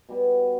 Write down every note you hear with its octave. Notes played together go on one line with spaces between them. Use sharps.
B2 G3 B3